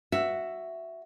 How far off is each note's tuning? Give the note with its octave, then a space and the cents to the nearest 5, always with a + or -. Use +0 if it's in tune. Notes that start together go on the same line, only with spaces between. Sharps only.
F#4 +0 E5 +5